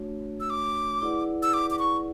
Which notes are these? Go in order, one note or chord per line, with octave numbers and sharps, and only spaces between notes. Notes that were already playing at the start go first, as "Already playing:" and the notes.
Already playing: A3 D4 F#4 C#5
E6
D6
E4 G#4 B4 D5 F#5
E6
D6
D6
C#6